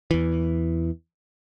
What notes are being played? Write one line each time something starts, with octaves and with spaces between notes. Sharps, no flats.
E2 E3